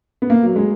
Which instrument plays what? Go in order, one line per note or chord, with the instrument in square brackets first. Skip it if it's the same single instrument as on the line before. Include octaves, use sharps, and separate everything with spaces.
[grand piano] B3
A#3
F#3
G#3